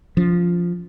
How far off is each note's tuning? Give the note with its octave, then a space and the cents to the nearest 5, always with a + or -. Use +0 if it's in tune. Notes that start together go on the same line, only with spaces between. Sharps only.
F3 +0 C#4 +45